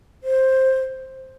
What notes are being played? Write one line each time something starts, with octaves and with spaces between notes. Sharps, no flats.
C5